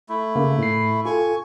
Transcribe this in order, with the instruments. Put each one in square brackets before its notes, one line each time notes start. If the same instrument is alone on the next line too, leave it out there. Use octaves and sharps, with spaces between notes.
[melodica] A3 E4
[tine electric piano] C#3 A#3
A2 C7
[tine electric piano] F4 A4 [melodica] G#5 C#6